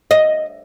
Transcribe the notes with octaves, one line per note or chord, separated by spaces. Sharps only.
D#5